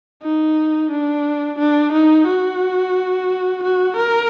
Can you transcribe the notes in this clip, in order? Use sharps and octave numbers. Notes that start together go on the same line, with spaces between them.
D#4
D4
D4
D#4
F#4
F#4
A#4